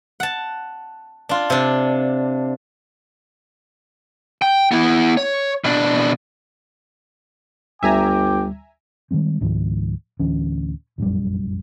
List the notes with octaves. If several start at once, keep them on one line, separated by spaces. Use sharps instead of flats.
F#5 A5
D4 F4
C3 D4
G5
B3 E4
C#5
B2 D4
G1 D2 G3 E5 G5 G#5 A#5 D6
D#3 G3 G#3 C4
C#2 G#2 D#3 F3
D1 D2 E3 C#4
F1 A#1 F#2 G3